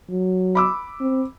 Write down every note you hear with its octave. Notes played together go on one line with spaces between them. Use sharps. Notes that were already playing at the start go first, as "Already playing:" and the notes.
F#3
B5 D6 E6
C4